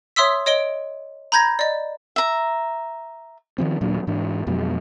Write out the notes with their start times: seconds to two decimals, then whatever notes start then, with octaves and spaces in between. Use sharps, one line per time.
0.16 C#5 E5 C6 D#6 E6 B6
0.46 C#5 D#5 D7 G7
1.32 A#5 B5 G6 G#6 A#6
1.59 D5 D#5
2.16 E5 A#5
3.58 D#3 F3 C4
3.81 D#1 A#2 F#3 D4
4.07 G#2 E3 D4
4.47 F2 B2 F#3 G#3